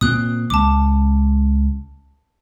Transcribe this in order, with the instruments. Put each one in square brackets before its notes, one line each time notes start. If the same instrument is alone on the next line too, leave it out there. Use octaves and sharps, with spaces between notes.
[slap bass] A#2 C4 [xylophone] D#6 F#6
[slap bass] C#2 [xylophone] A5 D6